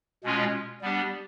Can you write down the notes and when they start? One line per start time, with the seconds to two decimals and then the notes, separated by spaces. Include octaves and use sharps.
0.24 B2 G#3 C#4 F4
0.82 G3 B3 D4 G4